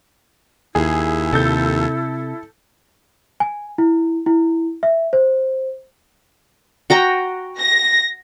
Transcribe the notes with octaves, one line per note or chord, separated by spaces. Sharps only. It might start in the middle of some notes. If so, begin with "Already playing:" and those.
D#2 E4 G#4
C3 A4 G6
G#5
E4
E4
E5
C5
F#4 G5 A#5
A#6